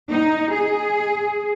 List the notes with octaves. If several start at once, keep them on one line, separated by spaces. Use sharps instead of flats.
D#4
G#4